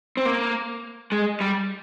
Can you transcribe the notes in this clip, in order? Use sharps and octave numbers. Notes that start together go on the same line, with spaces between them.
C4
A#3
G#3
G3